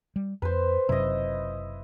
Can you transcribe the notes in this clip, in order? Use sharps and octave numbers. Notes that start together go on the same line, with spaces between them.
G3
F2 B4 C5
F#1 F#2 C3 E4 D#5